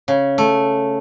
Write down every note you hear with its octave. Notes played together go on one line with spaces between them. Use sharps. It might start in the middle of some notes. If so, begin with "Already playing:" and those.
C#3
A3